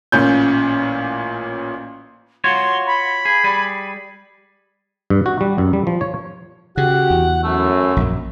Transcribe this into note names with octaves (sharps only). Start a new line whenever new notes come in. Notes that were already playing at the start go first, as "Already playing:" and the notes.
A1 A#2 C#4 G6
F4 F#4 C#5 C6
B5
G#4
G3 G#4
G2
F#4
G3
F#2
G3
F3
C#5
C#3 F#4 G4 F#5
E2
F#2 A3
A#1 F#2